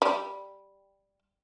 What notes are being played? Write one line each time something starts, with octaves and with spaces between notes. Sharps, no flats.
G3